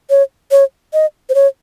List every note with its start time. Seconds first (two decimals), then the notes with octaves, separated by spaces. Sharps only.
0.10 C#5
0.51 C#5
0.93 D#5
1.29 C5
1.35 C#5